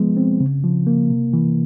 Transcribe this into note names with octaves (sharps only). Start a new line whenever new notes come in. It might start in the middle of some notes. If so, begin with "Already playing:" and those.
Already playing: F3 G#3 B3
C4
C#3
F3
A#3
C3
E3